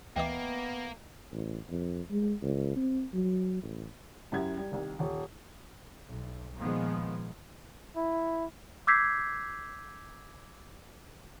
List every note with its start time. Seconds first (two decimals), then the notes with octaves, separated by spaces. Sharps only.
0.16 D2 E3 A#3 B3 D#5 E5 G5 D6
1.32 A1
1.70 F2
2.11 G#3
2.42 C#2
2.76 C4
3.13 F#3
3.63 A1
4.32 F#2 E4 G4 F#5 G#6
4.57 G3
4.71 C2 D#3
4.99 D#1
6.06 B1
6.57 A#2 D#3 F3 G#3 B3
7.96 E4
8.87 D6 E6 G6 G#6 B6 C7